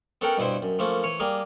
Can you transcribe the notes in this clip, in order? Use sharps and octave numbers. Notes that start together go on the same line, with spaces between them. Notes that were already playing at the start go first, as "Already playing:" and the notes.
B3 C#4 A4 A#4 F#5 G5
G2 B2 B3 E4 C5
F#2
F3 A3 A#3 C#4
E3 C#5
G3 A#3 G#4 A#4